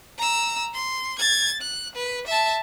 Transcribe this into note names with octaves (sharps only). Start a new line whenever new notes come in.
A#5 E6
C6
G#6 A6
F#6
B4
E5 A5